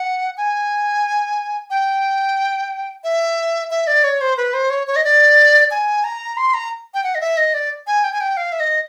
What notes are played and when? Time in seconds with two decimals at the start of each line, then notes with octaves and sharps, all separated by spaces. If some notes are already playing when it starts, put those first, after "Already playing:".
Already playing: F#5
0.37 G#5
1.70 G5
3.04 E5
3.71 E5
3.87 D5
4.04 C#5
4.21 C5
4.37 B4
4.54 C5
4.70 C#5
4.87 C#5
4.96 D#5
5.04 D5
5.71 G#5
6.04 A#5
6.37 C6
6.54 A#5
6.94 G5
7.04 F#5
7.15 D#5
7.21 E5
7.37 D#5
7.54 D5
7.87 G#5
8.04 G5
8.13 G#5
8.21 G5
8.37 F5
8.52 E5
8.60 D#5